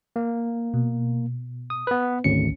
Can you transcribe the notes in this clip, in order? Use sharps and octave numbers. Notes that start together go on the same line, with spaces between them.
A#3
B2
D#6
B3 B4
G#1 D2 C#4 C#7